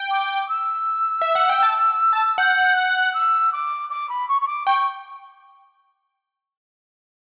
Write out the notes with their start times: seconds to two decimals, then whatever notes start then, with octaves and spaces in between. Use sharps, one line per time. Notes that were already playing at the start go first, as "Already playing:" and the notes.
Already playing: G5
0.11 D6
0.48 E6
1.22 E5
1.35 F#5
1.49 G5
1.63 A5
2.13 A5
2.38 F#5 G6
2.76 F#6
3.14 E6
3.52 D6
3.90 D6
4.09 B5
4.28 C#6
4.41 C#6
4.47 D6
4.66 G5 C#6